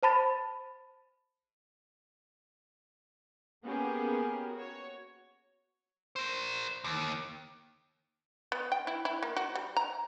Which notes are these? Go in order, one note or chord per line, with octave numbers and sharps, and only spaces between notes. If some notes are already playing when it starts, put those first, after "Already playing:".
C5 A5 B5 A6
A#3 B3 C#4 G4 G#4 A#4
F#4 C#5
A#4 C5
D#2
B3
G5
E4
E4
A#3
F#4
G3
A#5